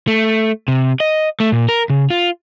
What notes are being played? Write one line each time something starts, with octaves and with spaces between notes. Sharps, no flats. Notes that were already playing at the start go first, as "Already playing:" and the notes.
A3
C3
D#5
A3
A#2
A#4
C#3
F4